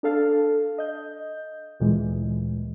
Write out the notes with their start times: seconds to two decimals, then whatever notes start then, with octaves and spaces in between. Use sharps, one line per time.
0.03 D4 A4 F5 A5
0.78 D#5 G6
1.80 D2 A#2 E3 G#3